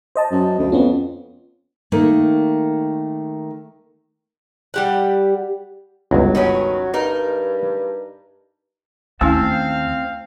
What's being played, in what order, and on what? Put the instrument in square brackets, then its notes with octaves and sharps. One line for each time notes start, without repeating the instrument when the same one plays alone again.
[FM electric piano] C5 D#5 A5
[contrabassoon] F#2
D2
[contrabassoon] F2 [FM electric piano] B3 C#4
[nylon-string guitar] D#3 A3 A#3
[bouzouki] G3 G4 F#5
[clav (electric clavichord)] G1 C#2 [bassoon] F#3
[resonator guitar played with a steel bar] D#3 B3 C#4
[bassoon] G2 [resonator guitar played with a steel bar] D#4 A#4
[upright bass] D#2 [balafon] A3 C#4 E4 [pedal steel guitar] C4 A5 E6 [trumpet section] F5